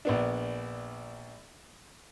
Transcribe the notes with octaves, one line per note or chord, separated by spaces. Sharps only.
A#1 B3 D4